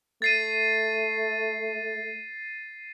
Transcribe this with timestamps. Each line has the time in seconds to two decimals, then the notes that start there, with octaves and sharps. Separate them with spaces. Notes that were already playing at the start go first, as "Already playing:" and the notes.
0.22 A3 A6 C7 D#7